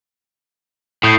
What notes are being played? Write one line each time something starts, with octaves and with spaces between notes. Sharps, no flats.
A2 D#6 G6 C7